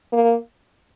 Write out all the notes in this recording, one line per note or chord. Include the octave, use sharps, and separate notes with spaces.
A#3